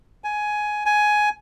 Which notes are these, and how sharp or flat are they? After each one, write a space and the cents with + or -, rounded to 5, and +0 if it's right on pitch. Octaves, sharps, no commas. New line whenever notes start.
G#5 +10
G#5 +10